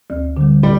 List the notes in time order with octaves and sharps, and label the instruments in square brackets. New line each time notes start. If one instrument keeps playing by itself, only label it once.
[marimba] D2
D3 G3
[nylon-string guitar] G3